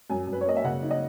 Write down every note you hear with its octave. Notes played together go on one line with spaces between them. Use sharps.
F#2 G#5
F#2
B4
C#5
A#3 D#5
E5
C#3 F#5
D#4
D#5